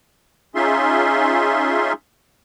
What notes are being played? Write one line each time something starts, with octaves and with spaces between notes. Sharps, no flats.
C#4 D#4 F4 G#4 E5 C6